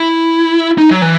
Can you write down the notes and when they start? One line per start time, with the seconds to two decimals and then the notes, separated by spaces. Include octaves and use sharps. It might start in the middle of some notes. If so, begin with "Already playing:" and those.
Already playing: E4
0.78 D#4
0.91 F#3
1.02 E3